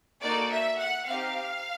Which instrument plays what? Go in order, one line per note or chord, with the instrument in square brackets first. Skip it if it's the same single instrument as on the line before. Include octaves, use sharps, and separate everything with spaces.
[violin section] A#3 D#4 F#4 A4 D5
E5
F#5
C4 D#4 G4 F5